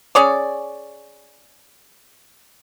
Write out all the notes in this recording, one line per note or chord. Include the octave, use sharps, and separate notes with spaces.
C#4 G#4 C#5 D5